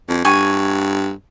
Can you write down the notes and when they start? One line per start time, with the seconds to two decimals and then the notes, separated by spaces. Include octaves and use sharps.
0.09 F2
0.25 G2 G#5 C#6